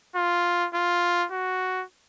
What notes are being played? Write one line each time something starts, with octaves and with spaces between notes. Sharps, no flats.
F4
F4
F#4